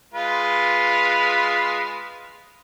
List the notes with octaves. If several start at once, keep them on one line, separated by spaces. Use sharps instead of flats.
G#3 F4 B4